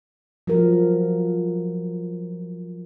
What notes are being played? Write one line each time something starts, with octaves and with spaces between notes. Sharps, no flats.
F3 F#3 A#4